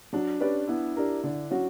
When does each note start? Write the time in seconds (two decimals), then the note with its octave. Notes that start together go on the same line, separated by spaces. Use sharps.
0.13 F#3 D4
0.40 C#4 G4 B4 D5
0.67 B3 E4
0.96 D4 G4 A#4
1.23 D3
1.51 F#3 C#4 F#4